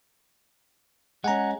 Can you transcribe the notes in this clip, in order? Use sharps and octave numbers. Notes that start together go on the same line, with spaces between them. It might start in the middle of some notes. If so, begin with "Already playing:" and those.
G#3 C#4 F#5 G#5 A#5